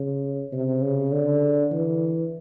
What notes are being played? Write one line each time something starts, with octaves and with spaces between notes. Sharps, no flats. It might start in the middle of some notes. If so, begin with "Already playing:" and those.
Already playing: C#3
C3
C#3
D3
E3